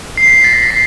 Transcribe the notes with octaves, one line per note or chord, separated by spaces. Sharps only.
C7
B6
A6
A#6
B6
C7